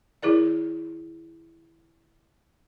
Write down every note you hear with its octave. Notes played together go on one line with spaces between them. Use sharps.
D#3 E4 G#4 A#4 D5